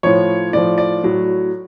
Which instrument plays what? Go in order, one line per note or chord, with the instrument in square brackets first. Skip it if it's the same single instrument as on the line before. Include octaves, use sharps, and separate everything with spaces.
[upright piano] A2 F3 C#5
A2 F3 D5
D5
A2 F#3